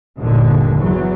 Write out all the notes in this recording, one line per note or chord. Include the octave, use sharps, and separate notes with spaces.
G1 D#2 A#2 D3
E2 F#3